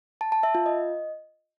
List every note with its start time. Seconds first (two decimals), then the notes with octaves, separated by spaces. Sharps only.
0.21 A5
0.32 A5
0.43 E5
0.55 F4
0.66 D#5